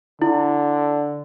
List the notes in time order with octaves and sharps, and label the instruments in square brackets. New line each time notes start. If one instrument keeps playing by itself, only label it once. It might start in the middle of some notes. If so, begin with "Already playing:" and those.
[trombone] D3 [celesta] E4